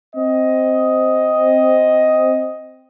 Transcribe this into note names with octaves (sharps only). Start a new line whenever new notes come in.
C4 D#5